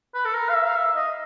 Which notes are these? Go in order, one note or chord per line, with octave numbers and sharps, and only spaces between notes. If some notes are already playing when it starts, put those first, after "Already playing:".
B4
A4
A#4
F5
E5
F5
E5
D#5